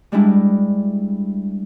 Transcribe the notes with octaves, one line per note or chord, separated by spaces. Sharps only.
G3 G#3 D4 E4